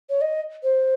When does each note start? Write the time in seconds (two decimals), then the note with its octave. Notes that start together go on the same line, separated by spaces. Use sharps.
0.09 C#5
0.21 D#5
0.63 C5